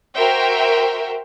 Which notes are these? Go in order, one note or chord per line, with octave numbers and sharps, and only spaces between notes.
F#4 A#4 C5 E5 G5